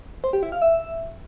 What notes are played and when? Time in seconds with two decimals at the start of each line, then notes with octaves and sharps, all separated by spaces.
0.24 C5
0.33 G4
0.43 E4
0.52 F5
0.62 E5